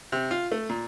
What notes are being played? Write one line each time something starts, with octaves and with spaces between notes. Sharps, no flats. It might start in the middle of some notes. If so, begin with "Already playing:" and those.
C3
F4
A3
A#2